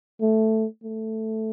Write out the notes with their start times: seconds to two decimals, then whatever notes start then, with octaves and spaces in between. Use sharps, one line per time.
0.21 A3
0.84 A3